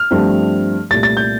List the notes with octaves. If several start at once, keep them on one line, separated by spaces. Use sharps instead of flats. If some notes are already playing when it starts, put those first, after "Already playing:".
Already playing: F6
G2 F3 A3 C4
C2 A#2 A3 A6
A6
G6